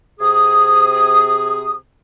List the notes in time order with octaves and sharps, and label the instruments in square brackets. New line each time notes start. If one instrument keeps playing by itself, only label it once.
[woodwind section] C3 G#4 D#6